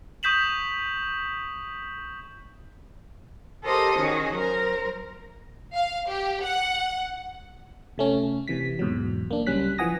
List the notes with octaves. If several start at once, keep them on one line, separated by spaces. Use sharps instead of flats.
C#6 D#6 G6 B6 E7 F#7
G4 A4 A#4 C5 D#5 D#6
D#3 C#4 F#4 G#4
F#3 A#4 C5
F5
G4
F#5
C3 A3 C#4
C3 E3 B6
E2 G#2 B2 F#3
A#3 D4
C#2 F#3 G3 C#4 F#6 B6
E3 F3 F#5 G#5 D#6 A#6